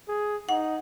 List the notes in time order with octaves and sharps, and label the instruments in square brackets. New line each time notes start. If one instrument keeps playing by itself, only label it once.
[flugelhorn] G#4
[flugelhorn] D#4 [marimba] F#5